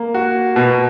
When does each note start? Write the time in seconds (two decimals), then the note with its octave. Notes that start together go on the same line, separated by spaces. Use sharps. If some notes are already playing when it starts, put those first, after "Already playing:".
Already playing: A#3
0.14 F#4
0.56 B2